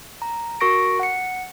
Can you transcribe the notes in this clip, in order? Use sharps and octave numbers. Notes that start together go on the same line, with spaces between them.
A#5
F#4 A#4 C#6 A#6 D7
F#5 C#7